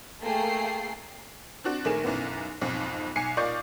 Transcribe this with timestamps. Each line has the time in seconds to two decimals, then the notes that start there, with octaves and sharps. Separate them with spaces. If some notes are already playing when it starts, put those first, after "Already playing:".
0.22 A3 A#3 G#4 G5 C7
1.64 C4 D4 F#4
1.85 A#1 D#3 A3 G#4 A#4 E7
2.03 B1 F#2 E3 B3
2.61 B1 F2 G#2 B2
3.16 B1 G#5 C7 C#7
3.37 A#2 F4 D5 D#5 C#6 G6